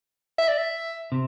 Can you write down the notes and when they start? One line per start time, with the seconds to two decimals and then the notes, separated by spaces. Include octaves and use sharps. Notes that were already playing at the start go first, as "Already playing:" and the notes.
0.38 E5
0.48 D5
0.58 E5
1.12 C3